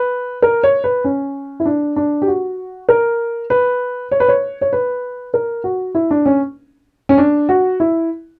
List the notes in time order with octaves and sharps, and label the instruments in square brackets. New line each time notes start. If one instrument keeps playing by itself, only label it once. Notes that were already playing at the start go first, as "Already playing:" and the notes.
Already playing: [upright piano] B4
A#4
C#5
B4
C#4
E4
D4
D4
G4
F#4
A#4
B4
C#5
B4
C#5
C#5
B4
A#4
F#4
E4
D4
C#4
C#4
D4
F#4
E4